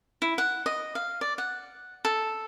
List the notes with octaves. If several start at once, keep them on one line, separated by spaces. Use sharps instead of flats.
E4
F#5
D#5
F5
D5
F#5
A4